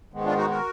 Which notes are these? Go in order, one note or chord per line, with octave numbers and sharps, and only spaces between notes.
G#2 D#3 G#3 B3
D4 F4
D#4 F#4
F#4 A#4